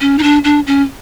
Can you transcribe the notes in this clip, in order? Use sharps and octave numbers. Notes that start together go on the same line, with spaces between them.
C#4
D#4
D4
D4
C#4